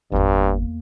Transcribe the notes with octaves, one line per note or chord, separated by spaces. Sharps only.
G1 E2 G2 A#3